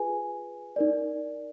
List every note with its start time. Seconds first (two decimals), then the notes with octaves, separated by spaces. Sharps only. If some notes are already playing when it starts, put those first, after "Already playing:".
Already playing: F4 G#4 B4 G#5
0.76 D#4 A#4 D5